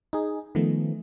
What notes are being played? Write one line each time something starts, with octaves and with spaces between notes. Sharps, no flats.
D#4 G#4
D#3 F3 A3 B3